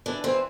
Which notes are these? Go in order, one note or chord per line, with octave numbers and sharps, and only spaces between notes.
E3 D4
E3 C4